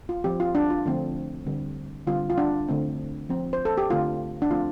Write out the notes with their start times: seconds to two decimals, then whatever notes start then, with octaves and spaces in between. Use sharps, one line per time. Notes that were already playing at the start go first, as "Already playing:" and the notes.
0.09 F4
0.24 F3 C4 G4
0.40 F4
0.55 D4
0.70 F4
0.85 D3 F3 A3 C4
1.46 D3 G3 C4
2.07 D3 G3 C4 F4
2.30 F4
2.38 D4
2.69 D3 A3 C4
3.29 F3 C4
3.53 C5
3.65 A4
3.78 G4
3.90 D3 A3 C4 F4
4.42 D4
4.51 F3 A3 C4 F4